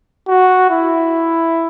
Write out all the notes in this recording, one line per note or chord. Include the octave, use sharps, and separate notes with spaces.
F#4
E4